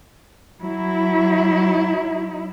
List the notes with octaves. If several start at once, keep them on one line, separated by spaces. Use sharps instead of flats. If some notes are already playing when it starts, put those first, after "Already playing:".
F#3 E4